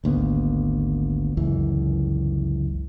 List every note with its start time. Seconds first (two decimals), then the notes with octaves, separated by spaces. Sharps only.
0.04 G#1 D2 A#3 B3
1.37 G1 C#2 F#2 E3